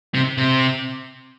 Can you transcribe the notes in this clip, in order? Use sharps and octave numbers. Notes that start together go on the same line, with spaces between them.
C3
C3